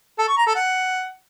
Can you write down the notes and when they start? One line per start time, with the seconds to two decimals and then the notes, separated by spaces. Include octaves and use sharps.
0.18 A4
0.28 C#6
0.37 A#5
0.46 A4
0.55 F#5